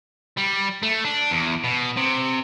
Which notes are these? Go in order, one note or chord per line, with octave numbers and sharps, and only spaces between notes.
G3
A3
D4
E2
B2
C3